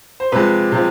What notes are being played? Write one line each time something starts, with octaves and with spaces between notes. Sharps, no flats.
C5
C3 F3 G#3 B4
C3 F3 G#3